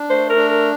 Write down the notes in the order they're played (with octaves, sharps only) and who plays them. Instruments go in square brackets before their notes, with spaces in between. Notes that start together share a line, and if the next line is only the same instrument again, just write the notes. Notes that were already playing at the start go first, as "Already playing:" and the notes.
Already playing: [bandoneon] D4
[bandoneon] A3 [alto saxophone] C5
[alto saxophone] A#4
[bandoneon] D4
[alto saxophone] A#4